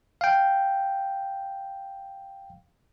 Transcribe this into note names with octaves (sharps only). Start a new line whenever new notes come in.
F5 G5